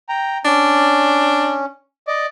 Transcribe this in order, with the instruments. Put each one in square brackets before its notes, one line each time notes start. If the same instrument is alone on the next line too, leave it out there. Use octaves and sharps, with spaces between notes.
[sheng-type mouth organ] G5 A#5
[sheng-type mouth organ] C#4 [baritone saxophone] D4
[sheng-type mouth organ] D5 D#5 D6